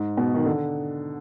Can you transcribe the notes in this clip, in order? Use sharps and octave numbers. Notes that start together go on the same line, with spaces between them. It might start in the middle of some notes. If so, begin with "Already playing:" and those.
Already playing: G#2
B2
D#3
D3